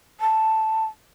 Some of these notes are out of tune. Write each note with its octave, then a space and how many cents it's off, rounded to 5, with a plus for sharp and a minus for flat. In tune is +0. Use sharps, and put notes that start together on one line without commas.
A5 +0